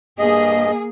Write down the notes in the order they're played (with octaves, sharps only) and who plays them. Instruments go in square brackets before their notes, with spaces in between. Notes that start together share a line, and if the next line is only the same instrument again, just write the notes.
[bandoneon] G2 D#5 [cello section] A#3 G#4